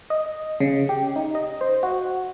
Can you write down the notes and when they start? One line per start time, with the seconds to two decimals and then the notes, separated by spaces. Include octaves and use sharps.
0.10 D#5
0.60 C#3
0.89 G4
1.16 D#4
1.35 D#5
1.61 C5
1.83 F#4